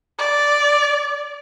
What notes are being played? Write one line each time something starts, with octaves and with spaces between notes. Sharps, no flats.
D5